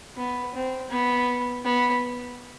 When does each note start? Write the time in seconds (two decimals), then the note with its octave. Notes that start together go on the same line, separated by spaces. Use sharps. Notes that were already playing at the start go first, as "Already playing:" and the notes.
0.17 B3
0.54 C4
0.91 B3
1.65 B3